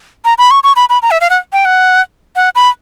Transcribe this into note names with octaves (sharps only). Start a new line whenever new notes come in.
A#5
B5
C#6
C#6
B5
B5
A#5
E5
F5
F#5
G5
F#5
F#5
B5